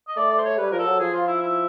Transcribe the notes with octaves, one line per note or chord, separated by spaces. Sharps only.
D#5
A3 D5
D5
C5
C#5
G3 B4
F3 A#4
A4
F#3
F3 G#4
F4
E4
E4